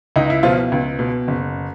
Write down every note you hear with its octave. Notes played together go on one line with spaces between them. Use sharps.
C#2 D#4
E4
B2 F3 F4
C#2
B2
F#1